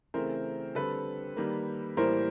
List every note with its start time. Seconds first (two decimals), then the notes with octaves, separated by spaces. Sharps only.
0.14 C#3 E3 A3 C4 A#4 C5
0.75 D3 G3 C4 A4 B4
1.37 D#3 G3 A#3
1.97 A2 E3 G3 A#3 A#4 C5